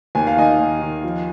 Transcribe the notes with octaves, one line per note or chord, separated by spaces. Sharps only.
D#2 G#5
F5
D#3 D#5 G#5
D#2
D#3
F3